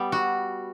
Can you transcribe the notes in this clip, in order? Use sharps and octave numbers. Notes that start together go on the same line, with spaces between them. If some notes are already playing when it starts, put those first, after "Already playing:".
Already playing: G3 B3
F#4